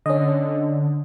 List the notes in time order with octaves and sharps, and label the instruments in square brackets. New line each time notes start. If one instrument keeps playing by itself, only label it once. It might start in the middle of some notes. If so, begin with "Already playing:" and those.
[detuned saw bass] D3 [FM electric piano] C#4 D#5